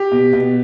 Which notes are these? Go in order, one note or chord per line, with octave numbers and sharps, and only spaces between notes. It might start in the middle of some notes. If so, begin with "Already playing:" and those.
Already playing: G4
B2
B2